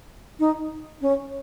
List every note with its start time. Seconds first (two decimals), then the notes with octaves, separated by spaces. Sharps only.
0.40 D#4
1.01 C#4